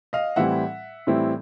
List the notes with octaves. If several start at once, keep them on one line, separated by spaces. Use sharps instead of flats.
D#5 F5
A2 E3 G3 C4 E4 E5 F#5
A2 E3 G3 C4 E4